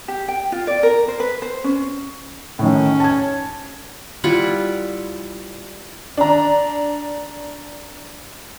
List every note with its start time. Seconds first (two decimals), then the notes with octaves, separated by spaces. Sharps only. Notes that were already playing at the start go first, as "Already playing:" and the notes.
0.08 G4
0.28 G5
0.52 F4
0.67 D5
0.83 A#4
1.08 C5
1.20 B4
1.42 C5
1.64 C#4
2.59 A2 D#3 C#4
3.00 A5 G#6
4.24 G3 E4 F4 F#5
6.17 D4 A#5